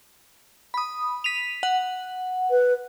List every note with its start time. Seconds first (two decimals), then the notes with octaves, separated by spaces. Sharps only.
0.74 B5 D#6
1.24 B6 D#7 F7
1.63 F#5
2.50 B4